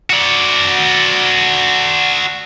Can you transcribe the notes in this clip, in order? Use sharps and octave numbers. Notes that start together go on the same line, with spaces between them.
F#4 D5